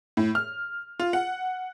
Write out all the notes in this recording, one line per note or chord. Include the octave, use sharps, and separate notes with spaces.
A2
F6
F4
F#5